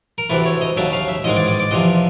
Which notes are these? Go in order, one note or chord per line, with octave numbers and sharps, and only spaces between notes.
A#4
D2 C3 E3 A3 B4
C#5
D#5
D#2 C#3 F#3 A3 E5
F5
E5
A1 G#2 D#3 G#3 D#5
D5
D5
D5
E2 C3 F3 D#5